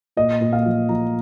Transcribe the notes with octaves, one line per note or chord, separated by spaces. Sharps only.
A#2 D#5
A#2
F5
F3
F3 A#5